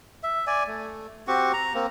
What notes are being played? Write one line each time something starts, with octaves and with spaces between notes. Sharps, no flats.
E5
D5 G#5
A3
C4 F#4 G4 C#6
A#5
A#3 C4